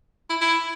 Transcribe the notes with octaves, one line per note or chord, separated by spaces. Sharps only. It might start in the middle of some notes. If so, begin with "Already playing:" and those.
E4
E4